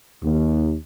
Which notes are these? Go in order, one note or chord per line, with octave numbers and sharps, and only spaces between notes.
D#2